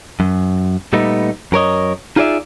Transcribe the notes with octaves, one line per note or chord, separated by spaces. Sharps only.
F#2
A#2 G3 A3 B3 D#4
F#2 A#4 C#5 D#5
D#4 F4 G#4 C5 D5 E5